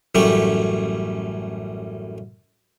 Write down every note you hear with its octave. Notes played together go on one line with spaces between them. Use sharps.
A1 F#2 G3 A3 G4 C#6